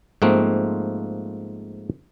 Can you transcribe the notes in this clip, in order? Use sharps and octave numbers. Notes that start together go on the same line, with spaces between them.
G#2 F3 A3 A#3 C4